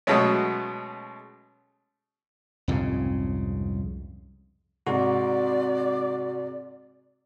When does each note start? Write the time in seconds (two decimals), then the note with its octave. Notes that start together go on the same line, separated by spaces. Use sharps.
0.07 B2 F#3 G#3 A3 C#4
2.68 C2 F2 G#2 C#3
4.87 G#2 C3 G#3 F#4 D5